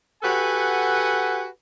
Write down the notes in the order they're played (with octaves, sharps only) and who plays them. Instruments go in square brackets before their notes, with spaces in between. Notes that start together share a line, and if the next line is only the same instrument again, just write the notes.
[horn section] F#4 G4 A4 B4 F#5 G#5